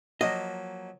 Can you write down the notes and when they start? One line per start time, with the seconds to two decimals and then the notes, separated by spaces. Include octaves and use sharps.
0.21 F3 F#3 A#3 D#5